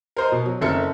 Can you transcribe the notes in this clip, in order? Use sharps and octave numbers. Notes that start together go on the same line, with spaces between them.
A#4 C5 D#5
B2
F#3
F#1 C4 A4 A#4 E5 C#7